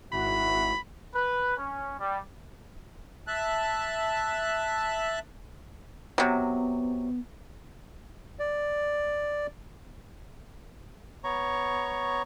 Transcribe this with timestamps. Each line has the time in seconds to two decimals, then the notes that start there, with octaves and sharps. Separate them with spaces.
0.13 G#1 E4 F#4 B5
1.15 B4
1.58 C#4
1.98 G3
3.28 E5 A5 F#6
6.18 C3 F#3 B3
8.39 D5
11.24 B3 C#5 A#5 C#6